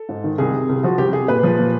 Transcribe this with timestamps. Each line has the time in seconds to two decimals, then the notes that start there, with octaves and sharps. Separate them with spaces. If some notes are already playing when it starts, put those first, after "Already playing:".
Already playing: A4
0.09 G#2
0.24 D#3
0.38 C2 G#4
0.53 C3
0.69 C2
0.83 F3 F#4
0.98 C2 G4
1.13 C3 G#4
1.28 A#2 B4
1.43 F3
1.59 A#2